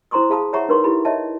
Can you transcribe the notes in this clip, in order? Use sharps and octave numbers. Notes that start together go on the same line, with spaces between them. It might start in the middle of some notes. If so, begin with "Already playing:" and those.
E4 C5 A#5 C6 C#6 D#6
G#4 F5 A5 B5 D#6
C#5 E5 F#5 A#5 B5 C#6
D#4 A#4 B4 C#5 C6 C#6
E4 G4 A4 B5
C#5 D#5 E5 G5 A5